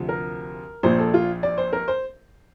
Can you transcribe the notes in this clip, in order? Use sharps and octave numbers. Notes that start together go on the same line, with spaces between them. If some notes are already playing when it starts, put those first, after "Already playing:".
Already playing: D2 C3 F3
A#4
A#1 A#2 F3 C5
A4
F4
D5
C5
A#4
C5